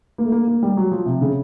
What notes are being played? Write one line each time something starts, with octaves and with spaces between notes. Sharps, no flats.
A#3
A3
A#3
A#3
G3
F#3
F3
C3
C#3